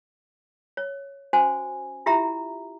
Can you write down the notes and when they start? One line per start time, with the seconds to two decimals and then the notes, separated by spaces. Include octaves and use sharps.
0.77 C#5
1.33 C#4 F#4 C5 G#5
2.06 E4 F4 G4 E5 A#5